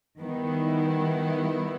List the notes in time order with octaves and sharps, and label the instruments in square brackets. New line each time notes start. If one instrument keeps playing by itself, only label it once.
[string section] D#3 G3 B3 E4